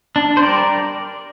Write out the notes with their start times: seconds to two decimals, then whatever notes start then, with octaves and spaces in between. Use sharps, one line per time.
0.16 D4
0.37 C5
0.42 G3 A#4 D5